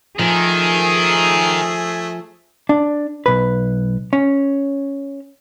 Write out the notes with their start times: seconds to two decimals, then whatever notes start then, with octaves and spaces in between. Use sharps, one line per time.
0.19 D#3 F3 A3 G#4 G#5
2.69 D4
3.26 B1 B4
4.13 C#4